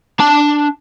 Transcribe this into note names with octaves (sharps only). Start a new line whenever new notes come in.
D4 A5